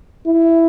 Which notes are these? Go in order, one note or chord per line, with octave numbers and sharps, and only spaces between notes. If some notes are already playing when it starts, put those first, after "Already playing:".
E4